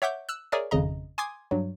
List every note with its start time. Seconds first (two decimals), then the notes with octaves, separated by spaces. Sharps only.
0.02 C#5 E5 F#5 D6 G6
0.29 E6 F#6
0.52 G#4 A#4 C#5 D5 E5 G#5
0.71 G#1 F2 C#3 D#5 A#5
1.18 G#5 C6 D6 D#6 G#6
1.51 G2 F#3